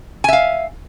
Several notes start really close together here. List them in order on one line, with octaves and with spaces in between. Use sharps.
G#5 E5 F5